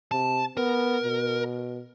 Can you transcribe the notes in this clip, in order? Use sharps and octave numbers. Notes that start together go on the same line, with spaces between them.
C3 A5
B3 A#4
B2